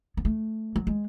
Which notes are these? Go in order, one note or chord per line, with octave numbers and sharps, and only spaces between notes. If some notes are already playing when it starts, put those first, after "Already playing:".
B3
A3
F#3
G#3